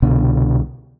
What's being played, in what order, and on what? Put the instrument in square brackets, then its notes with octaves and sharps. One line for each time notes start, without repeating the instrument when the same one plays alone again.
[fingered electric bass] C2 B2 D3